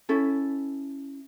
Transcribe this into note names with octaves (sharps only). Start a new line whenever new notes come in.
C#4 E4 A4